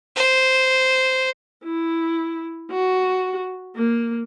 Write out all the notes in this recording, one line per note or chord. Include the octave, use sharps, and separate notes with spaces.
C5
E4
F#4
A#3